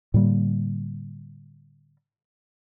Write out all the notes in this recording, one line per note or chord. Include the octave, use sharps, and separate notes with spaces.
A2 D3 G3 A#3